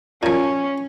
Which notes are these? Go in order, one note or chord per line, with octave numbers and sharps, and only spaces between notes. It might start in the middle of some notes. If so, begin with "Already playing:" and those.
A#2 F3 C#4